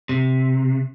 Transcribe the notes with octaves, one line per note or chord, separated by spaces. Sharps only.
C3